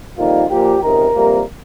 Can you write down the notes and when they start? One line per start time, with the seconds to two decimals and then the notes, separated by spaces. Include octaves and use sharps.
0.18 F2 D#3 G3 A#3 F4
0.50 A#2 F3 A#3 G4
0.82 C#2 C3 D#3 A#4
1.15 F2 C3 G3 A#3